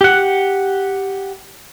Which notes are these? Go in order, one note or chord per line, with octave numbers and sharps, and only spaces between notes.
G4 F#5